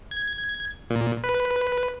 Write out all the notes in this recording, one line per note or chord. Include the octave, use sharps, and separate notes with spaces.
G#6
A#2
B4